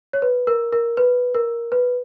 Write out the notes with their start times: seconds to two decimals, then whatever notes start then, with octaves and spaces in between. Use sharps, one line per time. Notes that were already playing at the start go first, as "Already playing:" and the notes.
0.13 C#5
0.22 B4
0.47 A#4
0.73 A#4
0.97 B4
1.34 A#4
1.72 B4